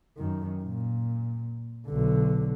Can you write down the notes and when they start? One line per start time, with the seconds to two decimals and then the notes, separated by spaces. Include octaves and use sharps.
0.17 F#2 D#3
0.63 A#2
1.88 B1 D3